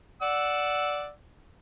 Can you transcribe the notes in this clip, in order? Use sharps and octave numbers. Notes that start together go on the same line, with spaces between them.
D5 F#5 E6